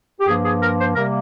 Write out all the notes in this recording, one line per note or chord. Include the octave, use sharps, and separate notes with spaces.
G4
G2 F3 A#3 G#4
G#4
A#4
C5
C3 G3 A#3 A#4